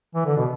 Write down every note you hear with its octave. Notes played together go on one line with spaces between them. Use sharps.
E3
D3
B2